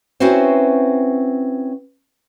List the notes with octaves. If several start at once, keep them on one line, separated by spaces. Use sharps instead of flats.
C4 C#4 E4 F#4 B4 C5